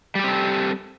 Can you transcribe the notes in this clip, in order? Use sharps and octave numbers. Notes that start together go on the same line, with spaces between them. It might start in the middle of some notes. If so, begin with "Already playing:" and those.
G3 C4 G4 A4